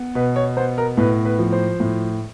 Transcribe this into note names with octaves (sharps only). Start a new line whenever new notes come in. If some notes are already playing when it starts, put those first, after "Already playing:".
Already playing: B3
B2 B4
C#5
B3 C5
A#4
A2 B4
B4
F3
C5
A2